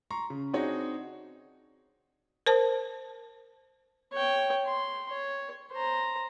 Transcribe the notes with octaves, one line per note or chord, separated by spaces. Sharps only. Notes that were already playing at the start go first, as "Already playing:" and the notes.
A#5 C6 C#6
C#3
C4 D4 D#4 F#4 G#4 C#5
A#4 C5 A5
C#5 G5
C6
C#5
C5 A#5